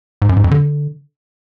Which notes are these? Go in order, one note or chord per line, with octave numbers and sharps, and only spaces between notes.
G#2
F#2
G#2
F2
D3